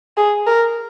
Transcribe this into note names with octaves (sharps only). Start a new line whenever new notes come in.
G#4
A#4